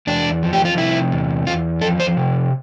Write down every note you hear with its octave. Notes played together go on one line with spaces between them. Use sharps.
E2 D4
F3
G4
F4
C3 E4
E2
E2 F4
F3 A4
C5
C3